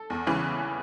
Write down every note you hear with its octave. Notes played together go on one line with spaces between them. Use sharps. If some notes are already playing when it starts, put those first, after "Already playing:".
Already playing: A4
E2
C#3 E3